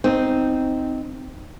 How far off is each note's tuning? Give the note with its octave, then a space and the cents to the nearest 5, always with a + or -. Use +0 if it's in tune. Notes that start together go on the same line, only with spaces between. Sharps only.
C4 -5 D#4 +0